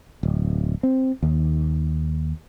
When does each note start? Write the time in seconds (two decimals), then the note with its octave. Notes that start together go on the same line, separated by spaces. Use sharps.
0.23 D1
0.83 C4
1.23 D#2